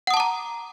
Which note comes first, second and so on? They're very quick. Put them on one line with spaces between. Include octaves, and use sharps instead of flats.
F#5 D#6 A5 D6 A#5